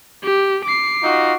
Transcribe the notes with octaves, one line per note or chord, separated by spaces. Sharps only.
G4
D6 C7
D#4 F4 F#4